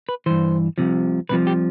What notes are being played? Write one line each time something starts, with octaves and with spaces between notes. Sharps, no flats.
B4
G2 E3 C5
C2 C3 F3
C2 C3 F3 B4
G4